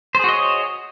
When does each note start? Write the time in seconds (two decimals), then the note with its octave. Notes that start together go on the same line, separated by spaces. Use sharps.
0.15 C5
0.19 G#4
0.24 F#4
0.29 D#5
0.33 C#5